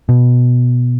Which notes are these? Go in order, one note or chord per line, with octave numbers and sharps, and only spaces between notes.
B2